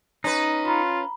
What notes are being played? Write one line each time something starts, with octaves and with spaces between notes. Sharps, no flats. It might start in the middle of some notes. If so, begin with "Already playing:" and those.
C#4 D#4 B4
F4 A#5 B5